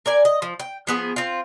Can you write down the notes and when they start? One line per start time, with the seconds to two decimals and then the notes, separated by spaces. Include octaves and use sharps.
0.06 A#4 D5 G#5
0.25 D#5
0.42 F3
0.60 G5
0.87 F3 B3 G#4
1.16 C4 F4